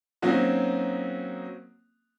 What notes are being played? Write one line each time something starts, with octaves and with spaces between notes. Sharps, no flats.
F#3 A#3 C4 C#4 D#4 F#4